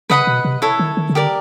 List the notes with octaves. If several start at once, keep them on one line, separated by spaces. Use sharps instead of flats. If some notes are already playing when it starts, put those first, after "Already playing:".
C#3 B4 D#5 F#5 B5
B2
C3
E4 A4 C#5
D#3
D#3
C#3
D3 G4 A#4 D5